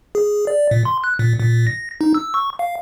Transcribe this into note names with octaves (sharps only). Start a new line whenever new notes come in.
G#4
D5
A#2
C6
F#6
A#2
A#2
A#6
D#4
E6
C#6
F5